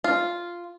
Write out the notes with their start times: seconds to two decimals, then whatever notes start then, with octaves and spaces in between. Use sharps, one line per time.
0.04 F4